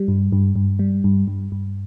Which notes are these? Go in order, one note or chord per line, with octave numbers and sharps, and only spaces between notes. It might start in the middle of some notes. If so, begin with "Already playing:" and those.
Already playing: G3
G2
G2
G2
G3
G2
G2
G2